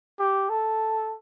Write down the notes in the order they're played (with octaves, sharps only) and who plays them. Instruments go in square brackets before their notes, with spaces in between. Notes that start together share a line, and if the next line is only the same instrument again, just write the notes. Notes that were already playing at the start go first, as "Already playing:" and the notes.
[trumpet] G4
A4